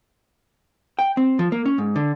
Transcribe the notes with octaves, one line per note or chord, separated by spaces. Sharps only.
G5
C4
F3
A#3
C#4
G#2
D3